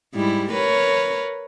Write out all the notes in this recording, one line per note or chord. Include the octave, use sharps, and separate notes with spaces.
G#2 G3 E4
A#4 B4 C#5